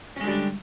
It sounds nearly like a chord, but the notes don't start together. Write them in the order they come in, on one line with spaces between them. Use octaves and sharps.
C#4 G#3 D3 G3 D4